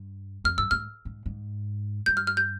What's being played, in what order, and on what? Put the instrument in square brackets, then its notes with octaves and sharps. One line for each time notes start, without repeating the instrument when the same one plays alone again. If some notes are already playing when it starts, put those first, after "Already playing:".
Already playing: [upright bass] G2
[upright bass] F2 [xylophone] F6
[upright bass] G2 [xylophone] E6
[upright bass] G#2 [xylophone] F6
[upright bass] G#2
G#2
[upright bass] G2 [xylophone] G6
[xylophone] F6
F6
G6